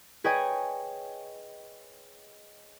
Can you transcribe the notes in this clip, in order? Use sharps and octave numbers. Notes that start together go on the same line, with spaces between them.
G#4 B4 C#5 D#5 G5 G#5